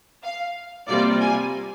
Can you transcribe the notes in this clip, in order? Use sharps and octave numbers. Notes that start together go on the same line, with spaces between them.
F5
C3 G3 A#3 F4 D5
G#5